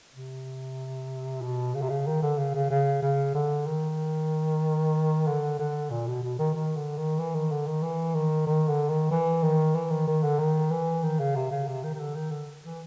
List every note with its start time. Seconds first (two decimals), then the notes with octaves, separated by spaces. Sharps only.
0.15 C3
1.42 B2
1.75 C#3
1.82 C3
1.90 C#3
2.07 D#3
2.22 D3
2.38 C#3
2.54 C#3
2.70 C#3
3.02 C#3
3.35 D3
3.67 D#3
5.27 D3
5.59 D3
5.91 A#2
6.07 B2
6.23 B2
6.39 D#3
6.55 D#3
6.76 D3
6.98 D#3
7.19 E3
7.35 D#3
7.51 D3
7.67 D#3
7.83 E3
8.15 D#3
8.47 D#3
8.68 D3
8.90 D#3
9.11 E3
9.43 D#3
9.75 E3
9.91 D#3
10.07 D#3
10.23 D3
10.39 D#3
10.71 E3
11.04 D#3
11.19 C#3
11.36 C3
11.51 C#3
11.67 C3
11.84 D#3
11.95 D#3
12.00 D3
12.15 D#3
12.31 D3
12.64 E3